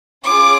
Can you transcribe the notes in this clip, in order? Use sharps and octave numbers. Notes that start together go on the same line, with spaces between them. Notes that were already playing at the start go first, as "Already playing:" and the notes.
C#4 F4 G#4 D6